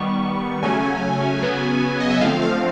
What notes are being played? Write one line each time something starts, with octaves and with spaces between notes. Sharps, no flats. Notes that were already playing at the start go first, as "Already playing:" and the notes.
Already playing: D#3 G3 B3 C#6
C#3 F#3 A3 C#4 G#5
C#3 F#3 B3
D#5
E5
D3 F3 A3 C4 F5
F5